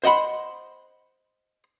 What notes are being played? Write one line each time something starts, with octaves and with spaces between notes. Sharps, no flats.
C5 D#5 F#5 B5 C6